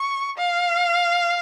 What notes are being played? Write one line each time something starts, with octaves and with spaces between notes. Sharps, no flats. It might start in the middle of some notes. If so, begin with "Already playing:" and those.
Already playing: C#6
F5